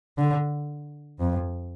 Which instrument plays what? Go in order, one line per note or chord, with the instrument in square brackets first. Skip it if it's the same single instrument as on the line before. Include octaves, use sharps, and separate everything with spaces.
[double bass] D3
F2